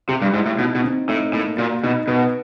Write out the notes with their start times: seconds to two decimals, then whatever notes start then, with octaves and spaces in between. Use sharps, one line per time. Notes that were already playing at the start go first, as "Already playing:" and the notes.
0.08 C3 G4
0.22 G2
0.34 G#2 E4
0.46 A2
0.59 B2 D#4
0.75 B2
0.84 C4
1.09 A2 D#4
1.33 A2 A#3
1.58 A#2 F#4
1.84 B2 D#4
2.08 B2 B4